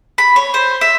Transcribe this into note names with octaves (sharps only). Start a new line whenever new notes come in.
B5
C#5
C5
E5